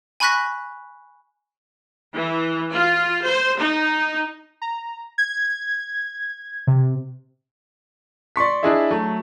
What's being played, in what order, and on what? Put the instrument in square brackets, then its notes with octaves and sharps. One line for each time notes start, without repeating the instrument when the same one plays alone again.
[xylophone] G#5 B5 C#6 F#6 A#6 B6
[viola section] E3
F4
C5
D#4
[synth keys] A#5
G#6
C3
[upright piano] D5 C6 C#6 B6
D4 E4 G#4 D#5 E5
F#3 A3